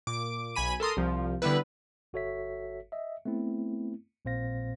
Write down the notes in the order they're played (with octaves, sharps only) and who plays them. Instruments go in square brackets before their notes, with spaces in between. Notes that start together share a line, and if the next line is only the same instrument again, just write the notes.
[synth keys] A#2 D6
B1 G#5 B5 D#7
A4 A#4 C6 D#6
C2 F3
D3 G3 B3 E4 B4
[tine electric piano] G1 F#4 A4 C#5 E5 B6
D#5 E5
A3 B3 C4 E4
A#1 A#2 C4 C5 F5 A#6